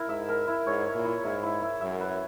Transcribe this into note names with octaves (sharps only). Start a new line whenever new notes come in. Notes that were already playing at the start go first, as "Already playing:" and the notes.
Already playing: E4 A#4
G#2 E5
A#4
E4
G#2 C#5
C#5
A#2
E4
G#2 E4
E4
E4
F#2 E5
B4